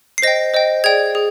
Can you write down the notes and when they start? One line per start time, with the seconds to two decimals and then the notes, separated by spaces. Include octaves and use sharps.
0.18 C7
0.22 C5 D#5 G5 A#6
0.54 C5 D#5 G5
0.84 G#4 D5 G5 G#6
1.15 G#4